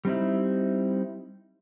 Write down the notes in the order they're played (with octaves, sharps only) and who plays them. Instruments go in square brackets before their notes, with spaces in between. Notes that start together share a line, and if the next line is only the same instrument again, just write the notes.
[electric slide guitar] G3 C4 D#4 E4